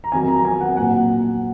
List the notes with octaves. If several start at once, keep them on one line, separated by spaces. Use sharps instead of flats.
A#5
F2 D#3 F#3 G#5
A#5
G#5
F#5
A#1 A#2 F#3 F#5